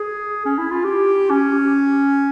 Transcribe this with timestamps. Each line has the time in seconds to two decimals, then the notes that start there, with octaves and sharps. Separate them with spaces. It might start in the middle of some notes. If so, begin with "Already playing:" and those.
Already playing: G#4
0.45 C#4
0.58 E4
0.71 F4
0.84 G4
1.30 C#4